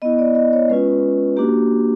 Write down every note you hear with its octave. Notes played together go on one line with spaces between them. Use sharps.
B3 E4 D#5
D5
D#5
C#5
G#3 C#4 F4 B4
A#3 D4 F#4 G4